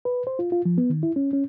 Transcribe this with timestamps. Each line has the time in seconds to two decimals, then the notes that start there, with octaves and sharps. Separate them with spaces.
0.05 B4
0.27 C5
0.39 F4
0.52 F4
0.65 F3
0.78 B3
0.90 D#3
1.03 E4
1.16 C#4
1.33 C#4